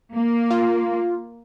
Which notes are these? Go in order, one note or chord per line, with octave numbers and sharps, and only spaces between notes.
A#3
F4